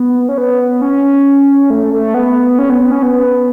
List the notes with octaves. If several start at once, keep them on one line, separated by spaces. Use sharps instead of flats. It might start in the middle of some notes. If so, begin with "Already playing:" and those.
Already playing: B3
C#4
B3
C#4
A3
A3
B3
C#4
B3
B3
C#4
B3